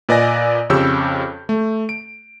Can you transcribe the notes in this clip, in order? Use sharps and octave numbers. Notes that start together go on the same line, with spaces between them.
A#2 B4 D5 D#5 G#5 A#6
F2 C#3 G4 C#5 E6 G6
A3
D7